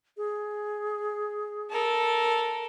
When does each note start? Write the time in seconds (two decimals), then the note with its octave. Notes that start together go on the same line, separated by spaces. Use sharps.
0.17 G#4
1.71 A4 A#4